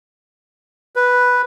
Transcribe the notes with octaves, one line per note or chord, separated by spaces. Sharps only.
B4